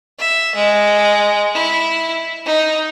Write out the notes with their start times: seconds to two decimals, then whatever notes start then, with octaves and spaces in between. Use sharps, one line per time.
0.19 E5
0.55 G#3
1.55 E4
2.45 D#4